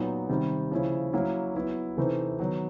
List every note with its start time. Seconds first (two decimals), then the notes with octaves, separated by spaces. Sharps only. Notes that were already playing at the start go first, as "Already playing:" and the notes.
Already playing: A#2 F#3 B3 D#4
0.29 C3 D#3 G3
0.71 C#3 F3 A#3 C#4 E4
1.13 F#3 A#3 C#4 E4
1.55 F#3 B3 E4
1.97 C3 E3 A3 C4 D#4
2.39 D#3 F#3 B3 D#4